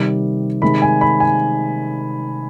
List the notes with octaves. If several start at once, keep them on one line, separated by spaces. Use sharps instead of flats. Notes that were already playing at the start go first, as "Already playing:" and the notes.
Already playing: C3 D#3 G3
C3 D#3 G#3 B5
G#5
B5
G#5